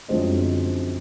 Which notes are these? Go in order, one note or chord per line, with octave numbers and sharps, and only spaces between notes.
F#2 D3 F3 G#3 C4 D#5